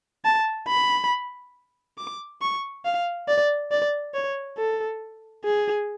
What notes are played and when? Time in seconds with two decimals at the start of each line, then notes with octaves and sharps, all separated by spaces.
0.25 A5
0.68 B5
1.98 D6
2.42 C#6
2.85 F5
3.28 D5
3.72 D5
4.15 C#5
4.58 A4
5.45 G#4